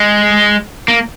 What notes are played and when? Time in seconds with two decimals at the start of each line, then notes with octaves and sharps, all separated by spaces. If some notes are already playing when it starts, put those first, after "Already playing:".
Already playing: G#3
0.88 A#3